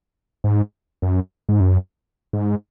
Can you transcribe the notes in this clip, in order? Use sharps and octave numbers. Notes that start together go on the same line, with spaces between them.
G#2
F#2
G#2
F#2
G#2